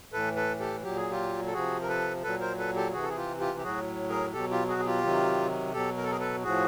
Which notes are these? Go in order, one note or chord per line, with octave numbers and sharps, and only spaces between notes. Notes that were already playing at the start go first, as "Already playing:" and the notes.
A2 E3 A4 B4
A4 B4
G4 A4
A#2 F#3 G4
G#4
F4 G4
A4
C3 F3 F#4 G#4
A#4
A4 B4
A#2 F#3 A4 B4
A#4 C5
A4 B4
G4 A4
C3 E3 F#4 G#4
A4
G#4
F4 G4
F4 G4
G4
A2 F#3 F#4 G#4
G#4 A#4
B2 F#3 G4 A4
F4 G4
F#4 G#4
G#4
F4 G4
C3 D#3 F#3
B2 F#3 G4 A4
A#4
A4
G#4 A#4
A4 B4
A2 F3 F#4 G#4